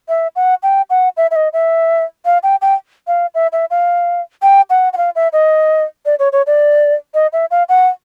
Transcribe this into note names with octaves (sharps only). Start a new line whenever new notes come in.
E5
F#5
G5
F#5
E5
E5
D#5
E5
F5
G5
G5
F5
E5
E5
F5
G5
F#5
F#5
F5
E5
D#5
D5
C#5
C#5
D5
D#5
E5
F5
F#5